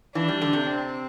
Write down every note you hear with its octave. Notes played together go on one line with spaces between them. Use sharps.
E3 D4
G3
D3
C3
C4